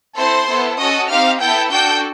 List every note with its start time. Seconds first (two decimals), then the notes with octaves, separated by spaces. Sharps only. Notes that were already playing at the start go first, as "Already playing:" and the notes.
0.16 C4 E4 A4 C5 C6
0.47 B3 E4 A4
0.78 C#4 F#4 A4 D#5 D#6
1.09 C4 D#4 G4 F5 F6
1.40 B3 E4 A4 G5 G6
1.71 D4 F#4 A4 G5 G6